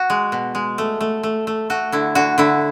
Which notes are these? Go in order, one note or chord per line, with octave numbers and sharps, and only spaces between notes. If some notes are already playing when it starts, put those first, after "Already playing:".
Already playing: F#4
G#3
B2
G#3
A3
A3
A3
A3
A3 F#4
D3 E4
D3 F#4
D3 E4